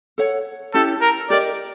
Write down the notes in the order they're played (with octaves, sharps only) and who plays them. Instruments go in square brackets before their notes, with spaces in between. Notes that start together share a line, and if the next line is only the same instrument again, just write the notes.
[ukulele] A4 C#5 F#5
[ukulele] C#4 E4 G4 [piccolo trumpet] A4
[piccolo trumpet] A#4
[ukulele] G4 A#4 D#5 [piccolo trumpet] D5